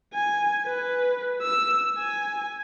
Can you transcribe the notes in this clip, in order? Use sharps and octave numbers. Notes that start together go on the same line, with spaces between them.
G#5
B4
E6
G#5